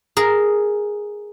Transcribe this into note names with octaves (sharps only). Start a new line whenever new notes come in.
G#4 A#4